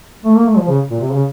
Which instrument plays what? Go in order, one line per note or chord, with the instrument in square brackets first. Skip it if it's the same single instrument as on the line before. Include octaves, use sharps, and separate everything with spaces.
[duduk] A3
A#3
A3
F3
C#3
A#2
C3
C#3